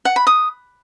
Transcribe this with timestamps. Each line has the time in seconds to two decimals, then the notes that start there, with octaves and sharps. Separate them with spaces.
0.05 F#5
0.16 B5
0.27 D#6